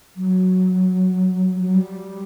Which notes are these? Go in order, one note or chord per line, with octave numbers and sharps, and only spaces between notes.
F#3
F#3
G3